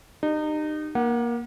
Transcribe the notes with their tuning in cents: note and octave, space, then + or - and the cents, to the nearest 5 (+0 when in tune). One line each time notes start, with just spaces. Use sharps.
D#4 -30 G4 +0
A#3 +20 F#5 +0